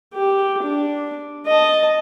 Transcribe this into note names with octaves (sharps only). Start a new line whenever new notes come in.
G4
D4
D#5 A5